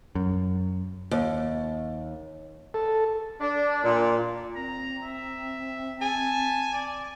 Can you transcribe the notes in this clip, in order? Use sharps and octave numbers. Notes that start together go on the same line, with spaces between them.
F#2
D#2
A4
D4
A#2
C4 A#5
E5
G#5 A5
D5